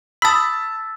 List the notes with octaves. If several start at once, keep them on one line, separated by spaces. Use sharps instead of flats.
A5 B5 D#6 E6 A6 B6